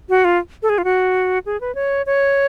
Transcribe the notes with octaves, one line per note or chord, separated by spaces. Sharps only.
F#4
F4
A4
G#4
F4
F#4
G#4
B4
C#5
C#5